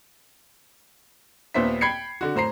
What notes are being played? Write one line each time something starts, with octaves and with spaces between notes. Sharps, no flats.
D#2 A#2 B3 C5 E5 B6
G5 B5 G#6 C7 C#7
D3 F#4
A2 C5 A#5 C7